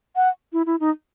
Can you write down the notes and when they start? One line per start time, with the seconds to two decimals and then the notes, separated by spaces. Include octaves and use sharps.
0.16 F#5
0.53 E4
0.66 E4
0.80 D#4